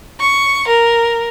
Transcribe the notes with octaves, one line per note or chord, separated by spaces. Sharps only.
C#6
A#4